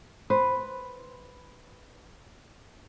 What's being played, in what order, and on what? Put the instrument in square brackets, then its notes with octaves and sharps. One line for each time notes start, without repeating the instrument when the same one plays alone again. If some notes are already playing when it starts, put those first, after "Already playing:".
[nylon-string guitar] B4 C5